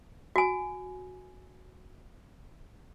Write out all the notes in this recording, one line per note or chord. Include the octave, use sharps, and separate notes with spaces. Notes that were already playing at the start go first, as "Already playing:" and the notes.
F#4 G#5